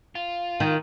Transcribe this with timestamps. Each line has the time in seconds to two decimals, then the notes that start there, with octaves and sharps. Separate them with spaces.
0.15 F4
0.60 D#3